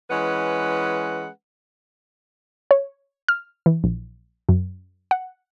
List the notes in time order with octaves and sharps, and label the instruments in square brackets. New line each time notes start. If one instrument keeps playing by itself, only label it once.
[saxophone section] E3 G#3 C#4 B4 F#5
[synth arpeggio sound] C#5
F6
E3
A#1
F#2
F#5